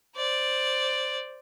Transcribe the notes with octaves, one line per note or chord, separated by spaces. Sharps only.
C5 D5